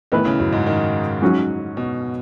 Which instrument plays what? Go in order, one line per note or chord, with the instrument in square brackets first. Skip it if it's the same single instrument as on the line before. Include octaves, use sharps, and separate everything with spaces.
[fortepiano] A2 E3 B3 E4 B4 [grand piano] D#3
[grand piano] C#3
F#2
G#2
D#3
[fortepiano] G#2 F#3 C#4 F#4
[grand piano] B2